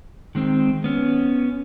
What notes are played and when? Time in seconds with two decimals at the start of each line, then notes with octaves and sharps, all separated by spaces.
0.35 D#3 G#3 C4
0.84 B3 C#4